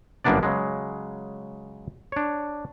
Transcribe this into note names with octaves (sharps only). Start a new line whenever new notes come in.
G1 F#2 A#3 B3 D4 D5
C#3 F#3 G#3
D4 C#5